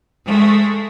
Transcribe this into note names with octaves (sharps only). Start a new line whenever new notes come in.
G#3 A3